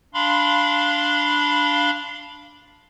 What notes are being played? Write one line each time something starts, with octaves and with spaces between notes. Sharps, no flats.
D4 F5 B5 C6